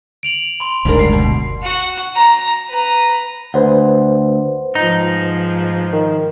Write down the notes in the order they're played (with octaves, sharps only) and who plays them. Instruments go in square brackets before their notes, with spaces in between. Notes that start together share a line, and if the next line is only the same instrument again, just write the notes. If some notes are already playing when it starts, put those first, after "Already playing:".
[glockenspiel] D7 F7 F#7
B5 C6
[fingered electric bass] F#1 D2 [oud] G#2 D4 A#4
[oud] G3 [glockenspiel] C7
[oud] B2
[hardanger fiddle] F#4 F#5
A#5
B4 A#5
[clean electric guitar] D2 [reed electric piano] B4 C5 F#5
[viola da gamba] G#2 F3 [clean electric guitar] D#4
[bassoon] D#3